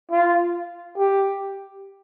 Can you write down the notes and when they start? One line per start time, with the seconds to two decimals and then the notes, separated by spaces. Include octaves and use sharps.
0.11 F4
0.97 G4